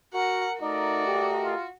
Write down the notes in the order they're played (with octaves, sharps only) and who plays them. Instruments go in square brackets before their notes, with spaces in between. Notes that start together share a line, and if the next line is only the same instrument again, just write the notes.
[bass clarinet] F#4 [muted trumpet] A#4 [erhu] F#5
[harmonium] A3 A#4 D#5 [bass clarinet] D#4 [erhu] F#4 [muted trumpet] D5
[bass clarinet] G4
[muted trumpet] F4